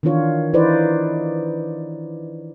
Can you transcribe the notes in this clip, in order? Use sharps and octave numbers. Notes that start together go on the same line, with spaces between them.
D#3 E3 D4 F4 C#5
E3 D#4 E4 B4 C5 D5